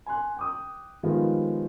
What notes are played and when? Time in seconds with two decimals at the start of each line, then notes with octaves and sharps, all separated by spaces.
0.06 G#5 C6 F#6
0.37 G5 D6 D#6
1.03 D#3 F3 G3 G#3 B3 F4